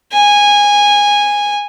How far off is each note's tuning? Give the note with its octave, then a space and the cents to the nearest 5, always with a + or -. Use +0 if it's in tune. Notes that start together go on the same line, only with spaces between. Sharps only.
G#5 -15